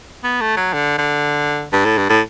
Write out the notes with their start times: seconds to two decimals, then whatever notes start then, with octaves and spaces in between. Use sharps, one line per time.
0.24 B3
0.41 A3
0.57 F#3
0.74 D3
0.98 D3
1.73 G2
1.85 A2
1.98 G2
2.10 A2